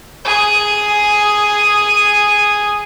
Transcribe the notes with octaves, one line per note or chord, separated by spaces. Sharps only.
G#4 D#6